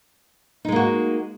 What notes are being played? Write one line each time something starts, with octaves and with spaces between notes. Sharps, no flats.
G#3 A#3 D#4 F#4